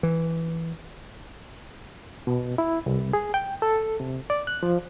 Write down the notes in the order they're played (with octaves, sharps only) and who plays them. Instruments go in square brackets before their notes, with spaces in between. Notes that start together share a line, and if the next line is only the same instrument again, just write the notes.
[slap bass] E3
[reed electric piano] B2
E4
C2
G#4
G5
A4
C3
D5
F#6
F3